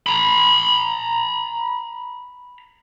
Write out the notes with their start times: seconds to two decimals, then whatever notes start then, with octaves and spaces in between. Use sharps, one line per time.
0.06 A#5 B5